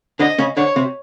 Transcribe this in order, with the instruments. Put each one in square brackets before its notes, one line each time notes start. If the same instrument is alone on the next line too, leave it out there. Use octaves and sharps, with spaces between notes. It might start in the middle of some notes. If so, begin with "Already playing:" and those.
[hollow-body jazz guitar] D3 D4 [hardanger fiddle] D#5
[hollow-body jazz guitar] C#3 C#4
[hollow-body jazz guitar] D3 D4 [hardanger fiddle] C#5
[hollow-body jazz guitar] C3 C4